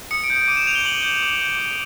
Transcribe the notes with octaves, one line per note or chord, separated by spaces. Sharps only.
D#6 C#7
D7
G6
D7
D6 D#7
E7
G6 F7
G7
D6 F#7
G6
D6
G6
D6